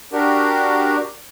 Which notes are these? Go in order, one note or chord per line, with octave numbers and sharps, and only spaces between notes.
D4 F#4 G4 A#4